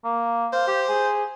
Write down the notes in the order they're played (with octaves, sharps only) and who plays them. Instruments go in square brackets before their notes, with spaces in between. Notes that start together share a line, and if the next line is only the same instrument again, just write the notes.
[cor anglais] A#3
[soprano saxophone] C5 [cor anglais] F5
[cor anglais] G4
G#4